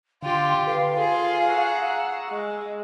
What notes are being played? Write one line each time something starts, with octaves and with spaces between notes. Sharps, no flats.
D3 F4 G4 C6
A4 B4 F5
F4 G#4 C6
F#5 A#5 C#6 E6
G#3